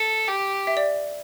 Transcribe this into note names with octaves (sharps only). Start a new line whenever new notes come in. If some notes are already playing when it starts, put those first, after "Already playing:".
Already playing: A4 A5
G4
E5
D5